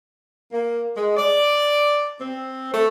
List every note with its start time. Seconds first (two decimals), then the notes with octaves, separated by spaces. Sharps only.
0.52 A#3
0.97 G#3
1.17 D5
2.20 C4
2.73 A3